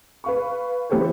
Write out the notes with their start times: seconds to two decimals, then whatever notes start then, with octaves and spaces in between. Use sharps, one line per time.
0.24 B4 F5 C#6
0.90 E3 B3 G4 A4 C5 C#5